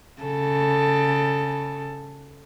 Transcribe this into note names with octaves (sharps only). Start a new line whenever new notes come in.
C#3 A4